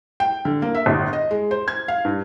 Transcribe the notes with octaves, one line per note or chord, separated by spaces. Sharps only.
G5
D3
A#3
E5
G1
D#5
G#3
C5
G#6
F5
G2